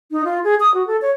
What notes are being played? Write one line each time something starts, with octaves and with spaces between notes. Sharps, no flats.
D#4
F4
G#4
D#6
F#4
A4
C#5